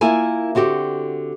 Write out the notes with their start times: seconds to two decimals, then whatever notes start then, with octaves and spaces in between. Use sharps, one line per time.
0.01 A#3 E4 F4 A#4 G#5
0.55 D3 C4 F#4 G4